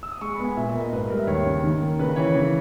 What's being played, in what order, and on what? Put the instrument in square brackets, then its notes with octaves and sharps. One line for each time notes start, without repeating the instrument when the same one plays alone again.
[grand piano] E6
D#6
G#3 C#6
B5
B3
G#5
A#2 E5
A#3 E5
D#5
G#2 B4
B4
G3 A#4
E5
D#2 C#5
C#3
D#3
A#3
C#3 B4
E3 C#5
C#3